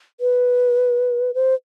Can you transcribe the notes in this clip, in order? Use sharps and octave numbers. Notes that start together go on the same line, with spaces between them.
B4
C5